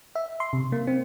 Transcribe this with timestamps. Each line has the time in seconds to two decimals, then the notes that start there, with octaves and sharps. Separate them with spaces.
0.15 E5
0.40 C6
0.53 C3
0.72 A#3
0.87 C4